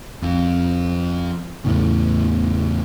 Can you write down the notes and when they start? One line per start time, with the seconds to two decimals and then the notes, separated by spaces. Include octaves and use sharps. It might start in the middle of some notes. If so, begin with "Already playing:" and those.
0.22 F2
1.64 E2 A2 C#3